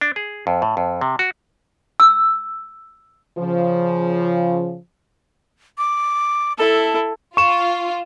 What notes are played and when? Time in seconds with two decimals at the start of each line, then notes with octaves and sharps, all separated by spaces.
0.01 D4
0.16 G#4
0.47 F2
0.62 A2
0.77 F2
1.01 C3
1.19 F#4
2.00 E6
3.38 C#3 F3
5.78 D6
6.58 E4 A4 A5
7.37 F4 C#6 E7